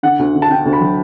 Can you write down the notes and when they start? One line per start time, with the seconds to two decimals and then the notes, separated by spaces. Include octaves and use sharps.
0.03 D3 F#5
0.19 D2
0.35 D3
0.42 A5
0.50 D3 G5
0.65 D2
0.73 B5
0.81 F#3